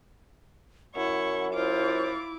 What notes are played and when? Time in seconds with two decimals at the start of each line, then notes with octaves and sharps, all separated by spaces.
0.95 F#2 E4 F#5 C#6
1.54 E4 F4 C5 D6